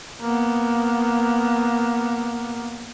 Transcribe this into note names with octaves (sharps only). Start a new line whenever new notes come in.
A#3 B3